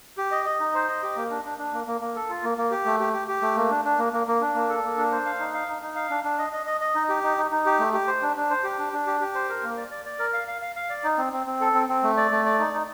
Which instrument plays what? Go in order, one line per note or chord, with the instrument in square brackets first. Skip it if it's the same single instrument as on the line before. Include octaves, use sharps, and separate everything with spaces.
[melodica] G4
D#5
D#5
D#4
C5
D#5
G4
A#3
D4
D4
D4
A#3
A#3
A#3
A4
F4
A#3
A#3
G4
A3
G4
G4
G4
A3
A#3
D4
D4
A#3
A#3
A#3
D4
A#3
A4
A#3
D4
C5
F5
D#4
F5
D#4
D#4
F5
D4
D4
D#5
D#5
D#5
D#5
D#4
G4
D#4
D#4
D#4
G4
A3
G4
C5
D4
D4
C5
G4
D4
D4
G4
G4
C5
A#4
A#3
D5
D5
D5
A#4
F5
F5
F5
F5
D5
D#4
C4
C4
C4
A4
C4
C4
A3
D5
A3
D5
D#4
D#4